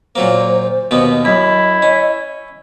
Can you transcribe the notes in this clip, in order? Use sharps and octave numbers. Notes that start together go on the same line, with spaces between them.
A#2 F#3 A#3 C5
D#2 B2 B3
F#2 E4 D#5
C#4